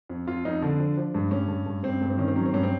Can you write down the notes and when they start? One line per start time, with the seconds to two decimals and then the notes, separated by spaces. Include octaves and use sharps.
0.09 F2
0.27 F2 F4
0.45 F2 D#4
0.62 D3 D4
0.79 F3
0.97 F3
1.14 G2
1.31 G2 C#4
1.48 G2
1.66 G2
1.83 G2 C4
2.02 G2
2.10 C4
2.18 D#3 C#4
2.28 C4
2.36 F#3 C#4
2.46 C4
2.53 G2 C#4
2.63 C4